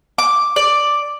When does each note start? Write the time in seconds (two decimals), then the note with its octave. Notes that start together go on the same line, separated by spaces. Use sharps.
0.18 D6
0.56 D5